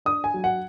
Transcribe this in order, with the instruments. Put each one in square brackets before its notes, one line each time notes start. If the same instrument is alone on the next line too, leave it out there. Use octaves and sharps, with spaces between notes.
[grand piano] D4 D#6
G#5
F#3
F#5